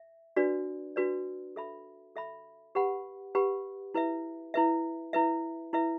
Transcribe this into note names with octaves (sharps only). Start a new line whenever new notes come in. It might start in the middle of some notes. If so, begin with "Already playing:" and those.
Already playing: E5
D4 F#4 B4 D5
D4 F#4 B4 D5
A4 E5 B5
A4 E5 B5
G4 B4 F#5 B5
G4 B4 F#5 B5
E4 B4 E5
E4 B4 E5
E4 B4 E5
E4 B4 E5